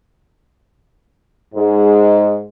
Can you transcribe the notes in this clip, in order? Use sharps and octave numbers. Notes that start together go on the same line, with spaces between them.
G#2 G#3